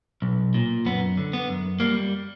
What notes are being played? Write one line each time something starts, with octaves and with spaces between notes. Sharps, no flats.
B1
A#2
F#2 B3
D3
B3
F#2
G3 A#3